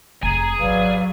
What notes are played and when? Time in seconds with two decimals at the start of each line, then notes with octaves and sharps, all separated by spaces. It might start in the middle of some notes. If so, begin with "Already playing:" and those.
0.23 F1 G#4 G#5 A#5
0.60 G#1 D#2 F#3 B4 D5 F5